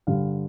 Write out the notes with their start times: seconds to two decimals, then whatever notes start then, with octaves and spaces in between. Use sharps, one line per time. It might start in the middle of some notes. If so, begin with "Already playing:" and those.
0.07 G2 D3 G3 F5